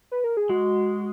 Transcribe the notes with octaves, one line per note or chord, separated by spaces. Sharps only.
B4
A#4
G#4
G#3 F#4